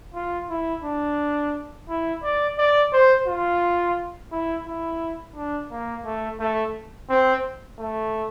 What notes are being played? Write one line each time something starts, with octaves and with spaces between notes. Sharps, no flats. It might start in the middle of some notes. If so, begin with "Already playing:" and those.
F4
E4
D4
E4
D5
D5
C5
F4
E4
E4
D4
A#3
A3
A3
C4
A3